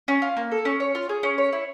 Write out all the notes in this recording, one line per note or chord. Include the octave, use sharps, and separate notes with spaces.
C#4
F4
A#3
A4
C#4
C#5
F4
G#4
C#4
C#5
E4